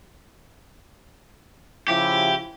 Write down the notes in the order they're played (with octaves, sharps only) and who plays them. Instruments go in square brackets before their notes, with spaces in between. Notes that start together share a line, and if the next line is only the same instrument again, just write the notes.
[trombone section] C#3 F3 E4 [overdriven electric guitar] G4